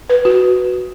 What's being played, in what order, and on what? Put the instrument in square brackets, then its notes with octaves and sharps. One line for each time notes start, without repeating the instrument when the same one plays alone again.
[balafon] B4
F#4